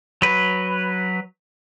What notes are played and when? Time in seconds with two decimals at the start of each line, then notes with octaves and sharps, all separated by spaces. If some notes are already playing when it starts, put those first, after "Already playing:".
0.22 F#3 B4